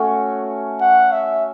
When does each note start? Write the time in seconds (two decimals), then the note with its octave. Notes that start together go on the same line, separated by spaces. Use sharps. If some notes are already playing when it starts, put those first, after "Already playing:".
Already playing: A3 C#4 F#4
0.81 F#5
1.12 E5